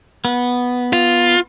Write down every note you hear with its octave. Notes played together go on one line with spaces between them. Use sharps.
B3
F4